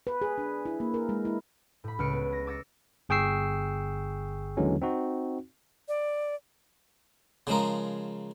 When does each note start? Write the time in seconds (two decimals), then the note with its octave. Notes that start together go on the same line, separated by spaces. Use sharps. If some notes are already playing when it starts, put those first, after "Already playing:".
0.07 B4
0.22 G#4
0.38 D4
0.66 E4
0.80 A#3
0.94 A#4
1.09 G#3
1.25 E4
1.84 A2 B5
1.99 C#2 B4 F6 C#7 D7
2.12 B3
2.33 A#6
2.47 D6 E6 A6 A#6 C#7
3.09 G1 G#4 G5 C#6 E6 C7
4.57 D#2 D3 E3 F#3 G#3 C#4
4.82 C4 D#4 F#4
5.88 D5
7.47 C#3 F3 G#3 A#4